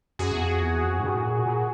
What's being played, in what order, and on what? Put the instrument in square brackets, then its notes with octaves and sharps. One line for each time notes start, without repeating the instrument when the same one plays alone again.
[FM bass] F#2 [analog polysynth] F#4 G#4
[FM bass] E2
F2
E2
F2
G#2
G2
A2
A#2
A#2